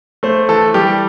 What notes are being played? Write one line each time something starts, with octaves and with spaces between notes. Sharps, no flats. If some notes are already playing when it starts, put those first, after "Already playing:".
A3 C5
E3 A4
G3 G4